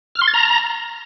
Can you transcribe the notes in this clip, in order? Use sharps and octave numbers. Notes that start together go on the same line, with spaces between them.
F6
C6
A6
A#5